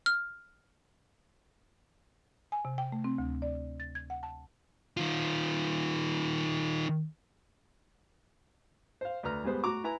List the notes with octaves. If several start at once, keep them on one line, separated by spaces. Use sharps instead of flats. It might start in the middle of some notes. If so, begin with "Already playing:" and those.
F6
G#5
C3
G5
A3
C4
D2
D5
A6
G#6
F#5
A5
D#3 F4
C5 F5
D2 B4 A#5 F6
G#2 G3 G#3 B3 C5
A2 F#4 A#5 D6
E4 B4 G#5 A#5